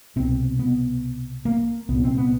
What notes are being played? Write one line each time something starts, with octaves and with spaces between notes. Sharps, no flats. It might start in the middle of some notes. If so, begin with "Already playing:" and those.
C2 B2 C4
B3
A#3
C2 A#2 B3
C4
B3